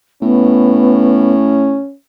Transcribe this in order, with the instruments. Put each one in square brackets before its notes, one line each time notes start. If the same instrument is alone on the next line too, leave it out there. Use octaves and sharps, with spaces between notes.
[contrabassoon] A2 [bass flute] B3 [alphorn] C#4